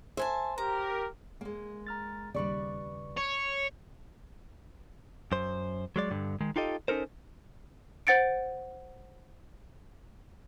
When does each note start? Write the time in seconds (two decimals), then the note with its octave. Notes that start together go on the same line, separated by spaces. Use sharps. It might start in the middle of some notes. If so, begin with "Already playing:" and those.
0.17 C5 E5 G#5 A5
0.58 G4 A#4 A#5
1.41 G#3 A#3
1.87 A#5 F6 A6
2.34 D#2 C#3 G3 B4 D5 C#6
3.17 C#5
5.32 F#2 C5
5.96 F#3 G#3 D5
6.11 G2 D3
6.41 D#3 G#3
6.56 D#4 F4 G4 A4 D#5
6.88 C#4 D#4 A4 A#4 C5
8.07 C5 F#5 A6 C#7 D7